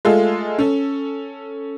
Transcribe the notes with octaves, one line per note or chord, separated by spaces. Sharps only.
G#3 A3 F4 G#4 A4
C#4 A4